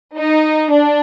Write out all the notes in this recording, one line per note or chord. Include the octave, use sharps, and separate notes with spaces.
D#4
D4